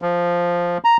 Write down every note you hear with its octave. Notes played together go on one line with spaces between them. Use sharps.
F3
A#5